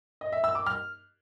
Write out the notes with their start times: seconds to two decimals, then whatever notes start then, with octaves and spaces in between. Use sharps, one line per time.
0.21 D#5
0.32 E5
0.44 E6
0.55 D6
0.66 F6